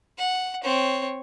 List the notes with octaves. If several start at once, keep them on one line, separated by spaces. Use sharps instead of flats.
F#5
C4 C#5